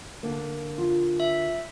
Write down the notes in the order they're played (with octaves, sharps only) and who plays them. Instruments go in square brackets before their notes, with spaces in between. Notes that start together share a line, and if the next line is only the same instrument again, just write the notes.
[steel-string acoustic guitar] D3 A#3
[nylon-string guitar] F4
[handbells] E5